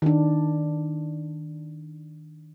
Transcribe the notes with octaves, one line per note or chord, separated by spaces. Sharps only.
D#3 D4